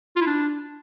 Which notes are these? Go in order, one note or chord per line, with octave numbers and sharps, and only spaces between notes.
F4
E4
D4